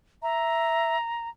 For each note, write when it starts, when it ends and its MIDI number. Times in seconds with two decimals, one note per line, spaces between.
0.23 0.96 76
0.23 1.29 82